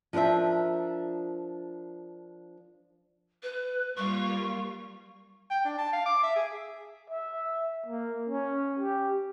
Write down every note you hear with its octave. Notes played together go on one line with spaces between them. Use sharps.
F3 D4 A#4 C5 E5
B4
G3 A#3 F4 C#6
G5
D4
A5
F5
D6
E5
G#4
E5
A#3
C#4
G4